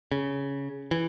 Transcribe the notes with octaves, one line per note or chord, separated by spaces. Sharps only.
C#3
E3